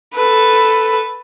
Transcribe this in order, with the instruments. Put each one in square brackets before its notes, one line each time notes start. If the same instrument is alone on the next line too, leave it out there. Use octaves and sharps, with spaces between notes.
[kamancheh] A4 B4